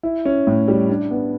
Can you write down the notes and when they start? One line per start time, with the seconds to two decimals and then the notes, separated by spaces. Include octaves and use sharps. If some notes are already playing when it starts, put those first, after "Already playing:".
0.03 E4
0.25 C#4
0.47 A2
0.68 G3
0.89 D4
1.11 B3